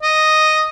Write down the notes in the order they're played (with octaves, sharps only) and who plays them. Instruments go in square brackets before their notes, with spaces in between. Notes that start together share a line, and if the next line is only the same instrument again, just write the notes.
[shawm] D#5